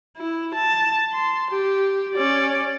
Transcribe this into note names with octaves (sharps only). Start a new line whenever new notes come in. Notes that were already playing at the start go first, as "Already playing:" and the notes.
E4
A5
C6
G4
C#4 D5